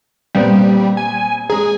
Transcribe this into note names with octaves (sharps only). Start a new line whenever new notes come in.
A#2 G3 B3 C4
G#5
G#3 G#4 A#5